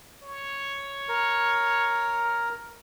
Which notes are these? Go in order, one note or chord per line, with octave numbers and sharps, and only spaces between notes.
C#5
A#4